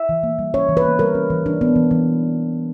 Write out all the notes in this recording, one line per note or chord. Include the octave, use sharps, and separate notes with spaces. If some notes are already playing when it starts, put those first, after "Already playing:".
Already playing: E5
E3
A#3
G3
C#4 C#5
E3
B4
A#3
G3 A#4
C#4
E3
D4
B3
E3
E3